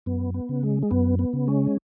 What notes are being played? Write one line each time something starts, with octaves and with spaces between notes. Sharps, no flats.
F#2 B3
B3
C#3
G#3
G#3
F#2 B3
B3
C#3
G#3 C#4